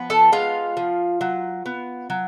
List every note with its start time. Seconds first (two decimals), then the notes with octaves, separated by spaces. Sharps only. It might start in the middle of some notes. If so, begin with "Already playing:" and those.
Already playing: F3 B3
0.10 A4 A5
0.32 G#3 F4 F5
0.77 F3
1.21 F#3
1.66 B3
2.10 F#3